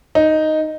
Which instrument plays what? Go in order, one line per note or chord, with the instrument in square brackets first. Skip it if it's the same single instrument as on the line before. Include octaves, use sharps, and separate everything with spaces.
[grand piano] D#4